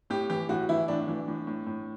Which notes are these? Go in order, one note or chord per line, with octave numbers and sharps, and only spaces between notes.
A2 G4
E3 G4
A2 F#4
E3 E4
A2 D4
E3
A2
A2
A2